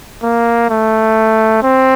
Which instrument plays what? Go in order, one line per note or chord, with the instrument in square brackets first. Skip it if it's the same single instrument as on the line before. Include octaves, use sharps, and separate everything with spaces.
[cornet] A#3
A3
C4